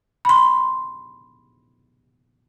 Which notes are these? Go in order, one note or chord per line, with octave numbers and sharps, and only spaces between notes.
B5 C6